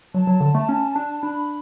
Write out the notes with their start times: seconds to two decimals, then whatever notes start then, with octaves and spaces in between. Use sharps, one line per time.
0.14 F#3 A5
0.27 F#3
0.40 D3
0.55 A3
0.69 C#4
0.96 D4
1.23 D4 B5